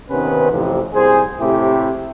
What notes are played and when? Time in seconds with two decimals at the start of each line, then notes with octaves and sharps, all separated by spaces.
0.10 C3 D#3 B3 C#4 B4 C5
0.51 A1 F2 C3
0.94 C2 G#4 C5
1.39 A2 C3 A3 E4 G4